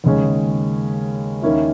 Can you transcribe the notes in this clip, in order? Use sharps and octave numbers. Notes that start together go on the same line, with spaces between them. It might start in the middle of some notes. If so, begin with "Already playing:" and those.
D#2 C#3 G#3 C#4
D#2 D#3 A#3 C#4 E4